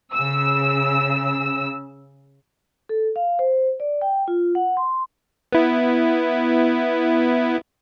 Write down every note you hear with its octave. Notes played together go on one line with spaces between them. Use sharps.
C#3 E6
A4
F5
C5
D5
G5
F4
F#5
C6
B3 E4